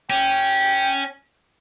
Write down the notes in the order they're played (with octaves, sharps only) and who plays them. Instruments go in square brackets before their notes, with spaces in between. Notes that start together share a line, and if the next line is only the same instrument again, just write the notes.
[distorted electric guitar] C#4 [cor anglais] G5